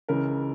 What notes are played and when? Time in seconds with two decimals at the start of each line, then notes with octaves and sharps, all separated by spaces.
0.09 C#2 C#3 E3 A#4